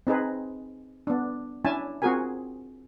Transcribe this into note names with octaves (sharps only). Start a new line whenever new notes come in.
C4 D#4 G#4 B4
B3 D4
C#4 D4 E4 G#5 A5
C4 F4 F#4 G#4 A#4 G#5